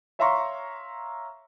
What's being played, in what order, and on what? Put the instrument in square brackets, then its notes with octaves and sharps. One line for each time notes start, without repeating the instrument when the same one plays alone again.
[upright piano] C#5 E5 F5 A#5 C6 C#6